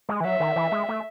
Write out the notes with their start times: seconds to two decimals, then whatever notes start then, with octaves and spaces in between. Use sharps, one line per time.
0.09 G#3
0.21 E3
0.25 F#3 E5
0.40 D#3
0.56 E3
0.72 G#3
0.89 A3